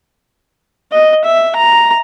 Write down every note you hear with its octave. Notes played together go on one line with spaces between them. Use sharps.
D#5
E5
A#5